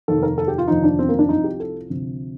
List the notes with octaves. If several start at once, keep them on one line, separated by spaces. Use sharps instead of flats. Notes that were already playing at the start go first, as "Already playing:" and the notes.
F1 D#2 D#3 A4
A#4
A4
G4
F4
F1 D#2 D3 F3 D#4
D4
C4
A#3
D4
C2 C3 F3 D#4
G4
A4
D2 C3 F3